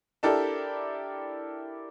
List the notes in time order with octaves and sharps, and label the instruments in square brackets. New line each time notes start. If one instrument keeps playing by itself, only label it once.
[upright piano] D4 E4 G4 A4 A#4 D5